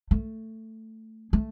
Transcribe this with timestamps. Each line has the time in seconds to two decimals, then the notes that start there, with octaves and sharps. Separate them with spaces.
0.11 A3
1.33 A3